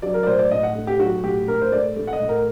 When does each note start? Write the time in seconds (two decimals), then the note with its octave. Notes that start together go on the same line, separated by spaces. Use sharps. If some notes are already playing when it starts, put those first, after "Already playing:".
0.02 F#3 D5
0.14 A#4
0.23 D5
0.27 A2 C5
0.39 D5
0.51 A2 D#5
0.63 F#5
0.75 A3
0.87 G4
1.00 F#3 F#4
1.23 A2 G4
1.48 A2 A#4
1.62 C5
1.72 A3 D5
1.96 A3
2.07 F#5
2.13 D#5
2.20 A2
2.29 A#4